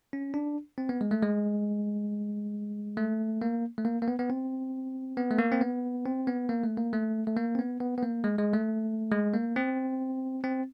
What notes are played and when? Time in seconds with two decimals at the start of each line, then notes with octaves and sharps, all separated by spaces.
0.13 C#4
0.34 D4
0.78 C4
0.89 B3
1.01 G#3
1.11 A3
1.23 G#3
2.97 A3
3.42 A#3
3.78 A3
3.85 A#3
4.02 A#3
4.08 B3
4.19 B3
4.30 C4
5.17 B3
5.31 A3
5.39 A#3
5.52 C4
5.61 B3
6.06 C4
6.27 B3
6.49 A#3
6.63 A3
6.78 A#3
6.93 A3
7.27 A3
7.37 A#3
7.55 C4
7.59 B3
7.80 B3
7.98 B3
8.03 A#3
8.24 G#3
8.39 G#3
8.54 A3
9.12 G#3
9.33 A#3
9.56 C4
10.44 C4